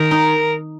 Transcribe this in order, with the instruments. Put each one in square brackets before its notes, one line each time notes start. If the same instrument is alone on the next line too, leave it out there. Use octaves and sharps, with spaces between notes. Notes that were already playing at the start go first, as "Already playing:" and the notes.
Already playing: [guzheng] D#3 [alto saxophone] A#4
[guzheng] D#4